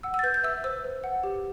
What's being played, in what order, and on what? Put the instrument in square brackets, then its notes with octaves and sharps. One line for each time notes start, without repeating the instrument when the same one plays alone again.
[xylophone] F#5 E6
E6
A6
B4 G6
G6
E5 E6
C5 E6
B4
F#5
G4